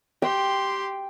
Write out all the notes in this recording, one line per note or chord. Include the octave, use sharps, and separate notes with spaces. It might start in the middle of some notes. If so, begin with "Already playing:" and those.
G4 G5 C6